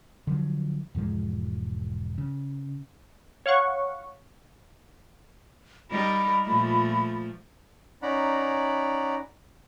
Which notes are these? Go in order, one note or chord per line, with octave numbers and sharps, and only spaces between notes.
D3 F3 F#3
E1 G#2 F3 G#3
C#3
C#5 F5 F#5 C#6
G3 D#4 A#4 B5
A#2 F3 A3
C#4 D#4 D5 F#5 A#5 B5